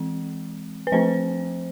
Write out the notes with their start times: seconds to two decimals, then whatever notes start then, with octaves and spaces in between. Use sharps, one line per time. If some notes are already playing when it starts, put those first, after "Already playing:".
Already playing: E3 G#3 C4
0.87 B4
0.92 F3 A3 C4 C5